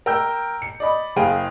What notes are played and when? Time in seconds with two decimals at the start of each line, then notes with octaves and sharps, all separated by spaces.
0.06 A#4 G5 E6 G6
0.62 C#7
0.80 D5 D#5 B5
1.16 F#1 G#4 C5 F5 G5 D#7